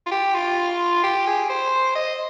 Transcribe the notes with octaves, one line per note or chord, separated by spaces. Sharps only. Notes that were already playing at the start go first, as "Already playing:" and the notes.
F4
G4
F4
G4
G#4
C5
D#5